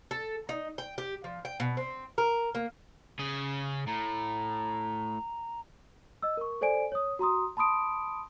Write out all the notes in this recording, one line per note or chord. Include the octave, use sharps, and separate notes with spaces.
A4
D#4
G5
G4
F3
G5
B2
C4
A#4
A#3
C#3 G#4
A2 A#5
D#5 E6
A#4 C#6
A4 C5 D5 G#5 D7
C#5 D#6
F#4 A#5 C6 D#6
A5 B5 C6 D#6 D7